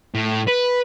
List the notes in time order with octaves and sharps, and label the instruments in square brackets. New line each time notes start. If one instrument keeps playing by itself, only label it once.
[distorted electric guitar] A2
B4